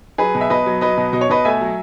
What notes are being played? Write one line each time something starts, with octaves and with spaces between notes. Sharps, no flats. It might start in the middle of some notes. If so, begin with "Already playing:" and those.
F#3 G#4 B4
B2
E5
B2 B4 D#5
F#3
F#3 B4 D#5
B2
B2 D#5
C#5
B2 B4 D#5
A3 E5 G#5
F#3